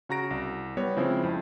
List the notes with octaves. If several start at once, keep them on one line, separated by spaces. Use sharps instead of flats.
C#3 F#4 A#5 A#6 D7
C2
G3 B3 C#5
C#3 F3 G#3 C4 E4 C5
F2